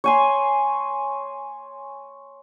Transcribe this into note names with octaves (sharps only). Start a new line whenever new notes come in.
C#5 G#5 C6